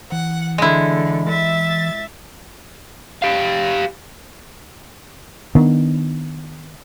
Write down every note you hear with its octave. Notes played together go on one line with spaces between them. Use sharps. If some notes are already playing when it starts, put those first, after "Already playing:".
E3 F#5
D3 G#3 E4
E5 A6
G4 F5
D#3 B3 D4